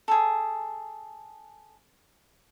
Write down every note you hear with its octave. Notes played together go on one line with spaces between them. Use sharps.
G#4 A4